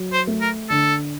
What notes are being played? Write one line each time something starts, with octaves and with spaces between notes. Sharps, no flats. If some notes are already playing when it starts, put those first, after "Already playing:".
Already playing: F#3
C5
A3
A#4
D3 A4